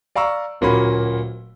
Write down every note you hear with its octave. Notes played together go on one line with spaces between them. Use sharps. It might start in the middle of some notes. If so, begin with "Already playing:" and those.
D5 F5 A#5 C#6 E6
D1 A#2 A#3 C#4 F#4 B5